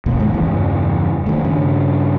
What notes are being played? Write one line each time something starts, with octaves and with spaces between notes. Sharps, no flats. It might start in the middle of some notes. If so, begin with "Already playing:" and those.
D#2 B2 A3
G#2 A3
E2 G2 C#3 E3
D#3 A3
G2 C#3